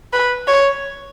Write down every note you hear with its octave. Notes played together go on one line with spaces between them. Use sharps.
B4
C#5